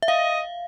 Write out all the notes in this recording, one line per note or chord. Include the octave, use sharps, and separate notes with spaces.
E5
D#5 F5